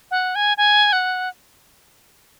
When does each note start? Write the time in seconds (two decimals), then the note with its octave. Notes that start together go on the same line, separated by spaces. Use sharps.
0.11 F#5
0.35 G#5
0.57 G#5
0.93 F#5